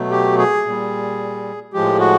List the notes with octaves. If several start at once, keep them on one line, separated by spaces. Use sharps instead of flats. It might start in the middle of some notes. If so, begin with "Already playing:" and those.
Already playing: B2 F#3 A3
G4
G#4
A#2 G3
A2 F3 G#3 G4
F#4